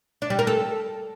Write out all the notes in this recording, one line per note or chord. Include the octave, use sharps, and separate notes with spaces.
D4
G3
A#4
A4